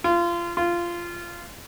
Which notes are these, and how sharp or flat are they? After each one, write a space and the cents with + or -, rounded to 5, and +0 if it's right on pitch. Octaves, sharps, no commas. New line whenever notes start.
F4 -25
F4 -15